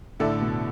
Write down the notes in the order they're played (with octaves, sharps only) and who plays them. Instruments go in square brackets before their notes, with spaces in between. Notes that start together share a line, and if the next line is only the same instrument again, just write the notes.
[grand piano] A2 [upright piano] D3 A3 E4 A4 D5
[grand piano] B2